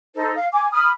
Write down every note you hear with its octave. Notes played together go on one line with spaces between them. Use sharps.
D#4 A4 C5
F5
G#5 D6
B5 D#6 F6